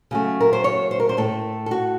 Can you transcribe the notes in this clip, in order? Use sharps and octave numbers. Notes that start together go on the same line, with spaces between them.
C#3 F#3 A3
A#4
C5
C#5
C5
A#4
C5
A2 A3 A4
A4
F#4